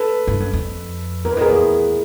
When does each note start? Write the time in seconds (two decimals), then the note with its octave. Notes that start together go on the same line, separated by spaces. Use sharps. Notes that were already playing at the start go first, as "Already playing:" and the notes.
Already playing: A4 B4
0.27 G2
0.40 F#2
0.53 F2
1.24 E2 A#4
1.33 B4
1.37 F2 G#4 A#4
1.49 E2